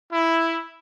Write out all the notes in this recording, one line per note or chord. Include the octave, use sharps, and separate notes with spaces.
E4